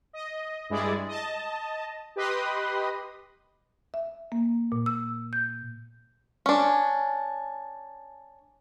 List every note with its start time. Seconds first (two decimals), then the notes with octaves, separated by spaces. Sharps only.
0.13 D#5
0.69 G2 G#3 E4 G#4 D5
1.07 D#5 A5
2.16 G4 B4 D#5 B5 C6 D#6
3.94 E5
4.32 A#3
4.72 A#2
4.86 E6
5.33 G6
6.46 C#4 D4